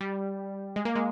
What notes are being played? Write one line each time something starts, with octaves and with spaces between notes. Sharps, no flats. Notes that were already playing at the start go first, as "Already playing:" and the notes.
G3
G#3
A#3
G#3